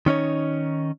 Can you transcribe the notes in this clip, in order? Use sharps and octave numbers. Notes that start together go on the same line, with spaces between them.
D#3 C#4 D#4 C#5